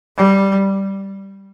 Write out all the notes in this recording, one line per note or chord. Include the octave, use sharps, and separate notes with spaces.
G3